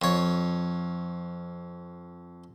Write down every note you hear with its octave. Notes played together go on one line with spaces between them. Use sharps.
F2 C#5